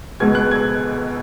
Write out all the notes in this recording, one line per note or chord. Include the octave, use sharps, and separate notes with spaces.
C#2 B2 G#3 G#6
F#6
G#6